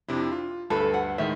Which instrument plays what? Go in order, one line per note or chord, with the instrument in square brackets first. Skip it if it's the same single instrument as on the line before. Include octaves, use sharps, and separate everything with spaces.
[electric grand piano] F2 C3 E4 [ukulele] D4
[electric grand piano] F4
[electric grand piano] D2 G2 B4 [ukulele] A4
[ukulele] F#5
[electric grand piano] A2 D#3 G#3 [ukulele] E5